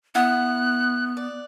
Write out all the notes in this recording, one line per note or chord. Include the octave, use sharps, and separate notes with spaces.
B3 E4 F#5 D#6 F#6
D5